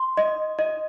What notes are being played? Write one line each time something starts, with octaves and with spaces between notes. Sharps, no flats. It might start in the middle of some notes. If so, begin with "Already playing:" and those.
Already playing: C6
D#5
D#5